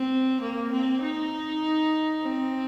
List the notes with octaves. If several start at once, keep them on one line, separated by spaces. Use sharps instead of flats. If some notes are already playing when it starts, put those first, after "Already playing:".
Already playing: C4
A#3
C4
D#4
C4